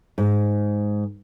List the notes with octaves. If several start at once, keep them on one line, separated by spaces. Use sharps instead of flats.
G#2